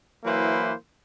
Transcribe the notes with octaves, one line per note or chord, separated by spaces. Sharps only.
E3 F#3 A#3 E4 B4 C5